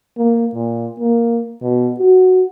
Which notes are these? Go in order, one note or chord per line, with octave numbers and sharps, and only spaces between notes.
A#3
A#2
A#3
B2
F#4